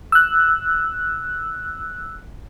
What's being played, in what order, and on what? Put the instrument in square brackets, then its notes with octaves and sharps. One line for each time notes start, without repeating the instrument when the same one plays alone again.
[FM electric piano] E6 F#6